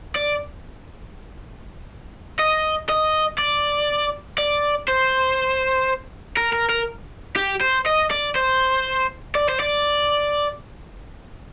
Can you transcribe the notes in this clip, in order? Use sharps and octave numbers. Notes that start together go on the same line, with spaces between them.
D5
D#5
D#5
D5
D5
C5
A#4
A#4
A#4
G4
C5
D#5
D5
C5
D5
C5
D5